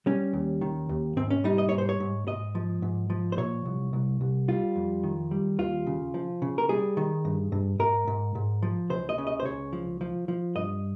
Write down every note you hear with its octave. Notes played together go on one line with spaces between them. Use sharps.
G3 C#4
D#2
D#3
D#2
G#2 C4
C#4
G3 D#4
D#5
G#2 C#5
C5
C#5
G#2
G#2 D#5
F3
G#2
F3
C5
A#2 C#5
C2
C2
C2
G3 F4
F2
D#3
G3
D#2 F4
C#3
F3
C#3
A#4
G3 G#4
D#3
G2
G2
G#2 A#4
G#2
G#2
F3
C#2 C5
D#5
C#3
D#5
C5
C#2 C#5
F3
F3
F3
G2 D#5